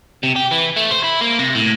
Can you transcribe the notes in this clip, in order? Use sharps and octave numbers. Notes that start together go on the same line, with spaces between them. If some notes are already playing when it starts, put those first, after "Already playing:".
C3
G4
E3
A3
C5
E4
A#3
C3
A2